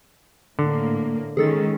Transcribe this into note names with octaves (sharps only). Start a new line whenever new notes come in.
A2 D3 A#3
D#3 G#3 C#4 G#4 A4 A6